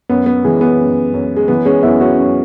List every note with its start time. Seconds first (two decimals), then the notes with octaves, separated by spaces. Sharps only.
0.09 F#2 B3
0.26 B3
0.45 E3 G#3
0.61 B3
0.79 F#2
1.14 F#2
1.36 G#3
1.48 E3 B3
1.65 G#3 C#4
1.83 F#2 B3 E4
2.00 C#4 F#4
2.18 F#2